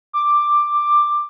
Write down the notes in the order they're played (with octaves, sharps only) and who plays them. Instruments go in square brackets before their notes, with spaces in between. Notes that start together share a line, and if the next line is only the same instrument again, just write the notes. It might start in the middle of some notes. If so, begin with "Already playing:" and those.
[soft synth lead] D6